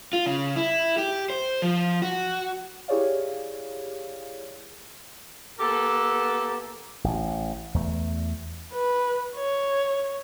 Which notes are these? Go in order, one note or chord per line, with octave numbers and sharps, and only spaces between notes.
F4
C#3
E4
G4
C5
F3
F#4
E4 G4 G#4 C#5 D5 F5
A#3 B3 G4 A4
A1
E2 A3
B4
C#5